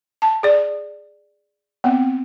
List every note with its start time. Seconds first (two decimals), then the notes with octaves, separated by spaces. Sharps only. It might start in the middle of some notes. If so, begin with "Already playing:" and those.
0.22 A5
0.43 G#4 D5
1.84 B3 C4